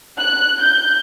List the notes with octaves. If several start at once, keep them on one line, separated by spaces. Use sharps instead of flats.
F#6
G6